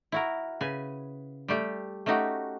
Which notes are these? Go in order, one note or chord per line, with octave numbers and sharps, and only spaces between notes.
E4 F#4 A#4
C#3 B4 G#5
G3 A3 G4
A3 C#4 D#4 F#4 G4